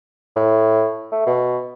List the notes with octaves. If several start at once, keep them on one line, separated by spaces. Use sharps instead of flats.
A2
A3
B2